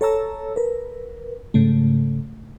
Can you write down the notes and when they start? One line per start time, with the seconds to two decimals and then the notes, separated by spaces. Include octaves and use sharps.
0.01 A4 C#5 A5 A#5 E6
0.56 A#4 B4
1.54 G#2 C#3 A3